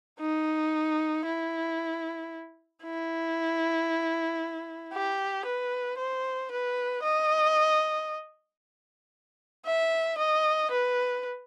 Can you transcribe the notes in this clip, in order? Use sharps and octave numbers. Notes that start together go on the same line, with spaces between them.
D#4
E4
E4
G4
B4
C5
B4
D#5
E5
D#5
B4